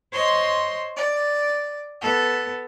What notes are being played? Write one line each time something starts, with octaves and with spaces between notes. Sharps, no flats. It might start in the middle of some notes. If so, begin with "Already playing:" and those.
C5 C#5 D#5 C6
D5
B3 A4